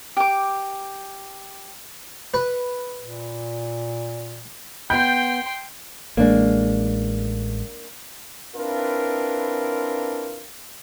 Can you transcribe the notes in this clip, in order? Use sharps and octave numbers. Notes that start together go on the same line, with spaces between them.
G4 D6
B4
A#2
B3 G5 B5 C6 G6
A1 G#3 A#3 D4
C4 D4 E4 F4 A#4 B4